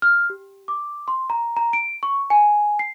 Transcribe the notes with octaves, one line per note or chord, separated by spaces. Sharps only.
F6
G4
D6
C6
A#5
A#5
D7
C#6
G#5
C7